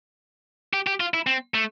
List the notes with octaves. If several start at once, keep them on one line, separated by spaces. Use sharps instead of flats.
G4
G4
F4
E4
C4
A3